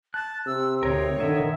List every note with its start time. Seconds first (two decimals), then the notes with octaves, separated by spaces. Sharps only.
0.14 A5 F#6
0.46 C3 E6
0.83 D2 C4 D#4 A#4 C#5
1.20 D3 D#3 A#4 D#5 E5